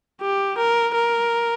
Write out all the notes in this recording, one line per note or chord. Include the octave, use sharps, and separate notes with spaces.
G4
A#4
A#4